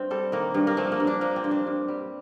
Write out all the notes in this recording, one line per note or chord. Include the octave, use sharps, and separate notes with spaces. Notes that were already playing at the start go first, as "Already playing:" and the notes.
Already playing: G2 C4
G3 A4
D#3 A#3
G2
A#3
F3 A3
A#3
G2
D4
F3 A#3
C4
G2
D4
G2
G3